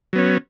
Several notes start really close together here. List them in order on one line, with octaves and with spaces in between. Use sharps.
F#3 B3 C#4